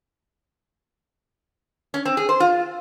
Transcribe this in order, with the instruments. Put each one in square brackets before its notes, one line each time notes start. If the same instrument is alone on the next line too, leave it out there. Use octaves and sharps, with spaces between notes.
[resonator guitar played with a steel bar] C#4
C4
G#4
C5
F4